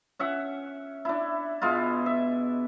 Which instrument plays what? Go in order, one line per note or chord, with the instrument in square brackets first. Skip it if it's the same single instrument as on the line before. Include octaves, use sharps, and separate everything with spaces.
[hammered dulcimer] C#4 E5 F#5
D4 E4
B2 G#3 E4 F4
E5